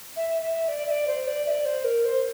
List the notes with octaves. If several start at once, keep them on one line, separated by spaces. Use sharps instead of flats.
E5
E5
D5
E5
D5
C5
D5
E5
D5
C5
A#4
C5